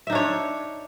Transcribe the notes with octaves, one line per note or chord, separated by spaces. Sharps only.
D4 D#4 C#5 E5